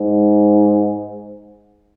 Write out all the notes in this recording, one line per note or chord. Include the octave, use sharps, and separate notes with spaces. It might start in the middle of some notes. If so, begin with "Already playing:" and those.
Already playing: G#2